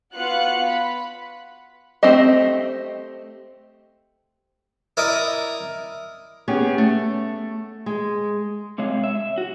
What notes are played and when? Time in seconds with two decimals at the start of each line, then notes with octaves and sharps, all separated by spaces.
0.16 B3 F4 F#4 F5 F#6 C#7
0.66 B5
2.03 A3 C4 G4 C5 D#5
4.97 E4 A#4 D5 D#5 A#5 D#6
6.48 B3 C#4 G4 G#4
6.78 A3
7.86 G#3
8.78 C3 G#3 C#5 F5
9.04 E5
9.38 F#4